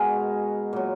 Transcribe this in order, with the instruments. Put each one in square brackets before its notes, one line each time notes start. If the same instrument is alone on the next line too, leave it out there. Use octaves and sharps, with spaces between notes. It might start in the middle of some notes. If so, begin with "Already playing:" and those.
Already playing: [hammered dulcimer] B2 G#3 F#4 G#4 A#4
A#2 F#3